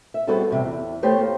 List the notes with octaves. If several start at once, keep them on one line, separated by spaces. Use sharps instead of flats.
E5
G3 B3 C4 F#4 G#4 A4
E2 C3
E2
A3 B3 G4 C5 C#5
A#3